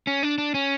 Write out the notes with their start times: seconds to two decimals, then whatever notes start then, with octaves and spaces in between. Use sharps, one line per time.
0.07 C#4
0.23 D4
0.38 D4
0.54 C#4